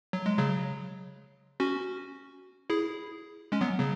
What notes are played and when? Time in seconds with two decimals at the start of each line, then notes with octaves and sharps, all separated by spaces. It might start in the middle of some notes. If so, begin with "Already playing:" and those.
0.13 F#3
0.26 G#3
0.38 C#3 F#3
1.60 C#4 F#4
2.70 E4 G#4
3.52 G#3 C#4
3.61 F#3 B3
3.79 C#3 F#3